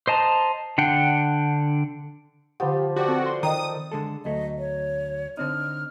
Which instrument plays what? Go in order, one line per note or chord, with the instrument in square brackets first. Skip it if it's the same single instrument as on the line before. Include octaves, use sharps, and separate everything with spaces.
[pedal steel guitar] C5 D#5 A5 A#5
D3 D4 F#5 G5
[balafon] D3 F#5 [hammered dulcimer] F3 [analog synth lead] G4
[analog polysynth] F#4 [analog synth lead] G4 [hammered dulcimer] B4 D5 G5
[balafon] C4 [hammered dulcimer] A4
[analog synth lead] C6
[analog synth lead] D#3 [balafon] D#5 G5 A#5 [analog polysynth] D#6
[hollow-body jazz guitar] D3 G#3 A4
[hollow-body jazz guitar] D2 F#3 A3 [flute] D#5
[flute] C#5
[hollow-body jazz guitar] D3 C4 D#4 [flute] F6